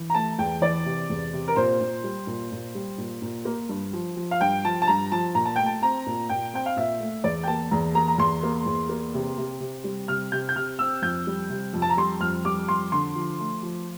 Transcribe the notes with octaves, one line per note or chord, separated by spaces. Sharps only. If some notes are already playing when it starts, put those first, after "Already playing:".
Already playing: E3
A#5
A3 A5
E2 G5
E3 D5
C3
E2
C3
A#4
A#2 C5
A#2
G3
A#2
A#2
G3
A#2
A#2
A#3
G2
F3
F3
F5
G2 G5
F3 A5
A5
G2 A#5
F3 A5
A#2 A#5
A5
A3 G5
A5
C4 A#5
A#2
A#2 G5
C4 G5
F5
A#2 E5
A3
E2 D5
G5
A#3 A5
E2 A#5
A#3 A#5
A#5
E2 C6
A#3
E2
A#3
C3
C3
C3
G3
C3 F6
C3 G6
G6
C3 F6
C4 E6
F2 G6
G3
C3
F2
A5
A#5
G3 C6
F2 F6
G3 D6
F2 C6
D3 C6
F3
A3
F3